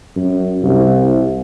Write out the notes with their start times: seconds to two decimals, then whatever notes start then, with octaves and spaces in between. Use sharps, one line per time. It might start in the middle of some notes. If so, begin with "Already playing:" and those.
0.16 F#2
0.63 C2